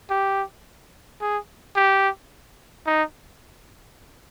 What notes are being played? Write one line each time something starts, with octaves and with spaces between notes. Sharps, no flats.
G4
G#4
G4
D#4